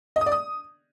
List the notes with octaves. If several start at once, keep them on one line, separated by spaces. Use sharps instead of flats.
D#5
D#6
D5
D#6